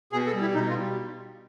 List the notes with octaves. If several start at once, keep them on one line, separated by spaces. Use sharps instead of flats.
B2 G#4
A4
G3
E4
B2 D#4
F4
G3